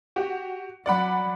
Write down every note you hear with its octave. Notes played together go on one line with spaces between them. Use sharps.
F#4 G4
F#3 D5 F#5 B5